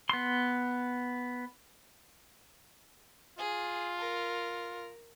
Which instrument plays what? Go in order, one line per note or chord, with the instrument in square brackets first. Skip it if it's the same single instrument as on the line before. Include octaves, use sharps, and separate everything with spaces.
[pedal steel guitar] B3 C6
[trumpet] F4 [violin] G#4
[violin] A#4